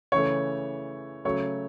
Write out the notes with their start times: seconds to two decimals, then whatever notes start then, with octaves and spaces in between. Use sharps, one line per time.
0.12 C#3 E3 A3 C#5
1.25 C#3 F#3 A3 C#5